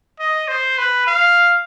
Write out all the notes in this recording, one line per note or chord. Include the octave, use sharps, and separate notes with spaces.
D#5
C5
B4
F5